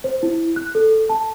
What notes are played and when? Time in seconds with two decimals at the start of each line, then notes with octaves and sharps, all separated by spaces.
0.04 C5
0.23 E4
0.56 F#6
0.75 A4
1.09 A5